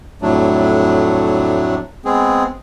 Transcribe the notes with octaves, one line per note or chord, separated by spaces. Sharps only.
F2 A2 F#3 A3 D4
G#3 B3 C4 G#4